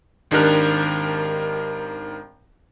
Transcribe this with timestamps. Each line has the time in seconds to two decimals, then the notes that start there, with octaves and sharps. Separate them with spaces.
0.31 G#1 D#3 D4 G4 A#4 F#6